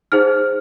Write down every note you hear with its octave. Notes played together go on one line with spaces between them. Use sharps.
D#4 G#4 C5 F6